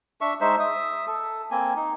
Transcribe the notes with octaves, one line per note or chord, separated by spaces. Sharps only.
D4 E5 C#6
G#3 D#4 C5 E5
E5 D#6
A4
A#3 C4 G#5
D#4